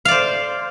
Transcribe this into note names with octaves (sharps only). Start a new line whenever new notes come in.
C5 D5 F5